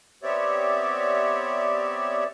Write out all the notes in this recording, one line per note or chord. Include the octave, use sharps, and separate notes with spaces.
B3 C4 G4 C#5 D5 E5